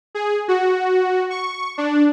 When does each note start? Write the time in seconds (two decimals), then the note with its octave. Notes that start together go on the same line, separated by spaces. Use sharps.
0.15 G#4
0.48 F#4
1.30 C#6
1.78 D4